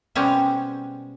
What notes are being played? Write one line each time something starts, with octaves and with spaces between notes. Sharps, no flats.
B2 G3 G#3 C4 C#4